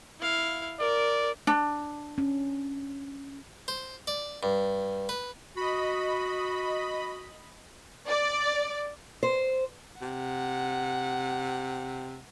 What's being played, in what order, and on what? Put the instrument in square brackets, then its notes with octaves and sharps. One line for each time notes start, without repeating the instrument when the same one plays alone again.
[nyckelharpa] E4 F5
[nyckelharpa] A#4 [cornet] D5
[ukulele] D4
[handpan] C#4
[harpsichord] C5
D5
G2
B4
[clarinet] F#4 [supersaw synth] D#5 B5
[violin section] D5
[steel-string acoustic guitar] C5
[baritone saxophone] C3 [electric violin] F#5